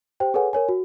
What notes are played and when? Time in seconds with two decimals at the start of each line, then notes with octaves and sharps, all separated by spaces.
0.20 G4 C5 G5
0.34 G#4 A4 B4 C#5 F#5 G#5
0.53 A#4 C#5 G#5
0.69 F#4